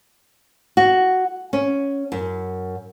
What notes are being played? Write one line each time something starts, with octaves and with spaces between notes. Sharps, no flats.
F#4
C#4
F#2